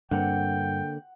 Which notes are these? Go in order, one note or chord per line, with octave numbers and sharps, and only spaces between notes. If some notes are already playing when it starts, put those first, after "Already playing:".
G2 D3 A#3 C4 F#5 G5